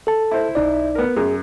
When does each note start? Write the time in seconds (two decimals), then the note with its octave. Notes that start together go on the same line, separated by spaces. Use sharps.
0.07 A4 A5
0.31 E4 C5
0.55 B1 D#4 D5
0.95 B3 A#4
1.17 F#2 G#4